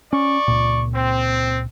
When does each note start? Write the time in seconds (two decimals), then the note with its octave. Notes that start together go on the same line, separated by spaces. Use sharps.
0.13 C#4 D5 C#6
0.48 C#2 A#2
0.94 C4